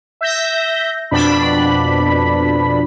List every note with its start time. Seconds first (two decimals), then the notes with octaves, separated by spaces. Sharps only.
0.21 E5 G6 A#6
1.11 F2 B2 D4 B5